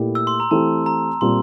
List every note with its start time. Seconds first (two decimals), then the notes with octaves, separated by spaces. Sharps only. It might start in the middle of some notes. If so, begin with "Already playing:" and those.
Already playing: A#2 A3 E4 G4
0.15 E6
0.27 C6
0.40 A#5
0.51 E3 A3 C4 G4 A5
0.86 A#5
1.21 A#2 G3 C4 F4 C6